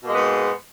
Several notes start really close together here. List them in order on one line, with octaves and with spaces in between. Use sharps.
B2 A#3 G#3 B3 G#2